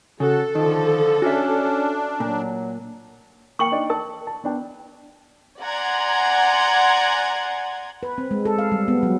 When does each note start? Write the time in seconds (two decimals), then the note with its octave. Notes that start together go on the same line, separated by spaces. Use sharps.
0.20 C#3 F#4 A4
0.55 D3 D#3 F3
1.22 C#4 D4 F#4 E5
2.20 A#2 F#3
3.59 A#3 G5 C#6 F#7
3.72 D4 D#4 D5
3.90 A#4 A5
4.27 A5
4.44 B3 D4 G5
5.60 D5 F#5 G#5 A#5 C6 G#6
8.03 B4
8.18 C4
8.31 G#3
8.45 A4
8.59 F5
8.72 G3
8.88 B3
9.03 F#3